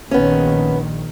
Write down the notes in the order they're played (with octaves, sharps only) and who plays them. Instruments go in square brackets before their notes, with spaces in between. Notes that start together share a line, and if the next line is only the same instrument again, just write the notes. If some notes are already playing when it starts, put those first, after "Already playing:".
[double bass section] A#1 D#3 [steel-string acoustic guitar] B3 C#4